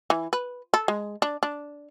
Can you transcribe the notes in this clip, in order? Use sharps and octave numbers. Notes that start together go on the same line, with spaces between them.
E3
B4
A4
G#3
D4
D4